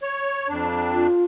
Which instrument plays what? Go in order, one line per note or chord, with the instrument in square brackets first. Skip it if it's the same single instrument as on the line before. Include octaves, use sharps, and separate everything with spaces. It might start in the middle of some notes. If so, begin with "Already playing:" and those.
[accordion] C#5
F2 D4
[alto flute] F4